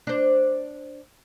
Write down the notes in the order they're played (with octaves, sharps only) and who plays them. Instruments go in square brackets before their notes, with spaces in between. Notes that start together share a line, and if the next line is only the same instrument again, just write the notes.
[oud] D4 C5